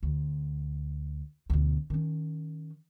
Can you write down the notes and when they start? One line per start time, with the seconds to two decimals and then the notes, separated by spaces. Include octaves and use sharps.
0.03 D2
1.50 D2 B2
1.90 D#3 C#4